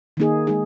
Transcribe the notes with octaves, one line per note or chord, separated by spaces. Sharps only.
D#3 A#3 D#4 G#4
G#3 D#4 G#4